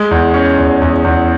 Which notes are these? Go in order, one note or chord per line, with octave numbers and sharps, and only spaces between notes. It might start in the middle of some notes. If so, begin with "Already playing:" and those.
Already playing: G#3
E2
C#4
E2
E2
E2